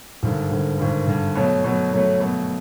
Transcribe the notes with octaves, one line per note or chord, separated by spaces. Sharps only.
G#1 G2 D3
G#1 G2 D3
G#1 G2 D3
G#1 G2 D3
B2 F#3 A3
B2 F#3 A3
B2 F#3 A3
B2 F#3 A3